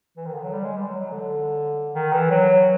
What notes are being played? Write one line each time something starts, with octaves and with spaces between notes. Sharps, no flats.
E3
D#3
D3
F#3
G3
G#3
G3
F#3
F#3
D3
D#3
E3
F#3